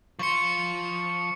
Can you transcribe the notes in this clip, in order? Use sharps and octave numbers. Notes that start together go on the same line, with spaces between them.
F3 C6 C#6 C#7